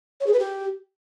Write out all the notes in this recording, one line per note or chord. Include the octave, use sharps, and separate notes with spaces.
C#5
G#4
B4
G4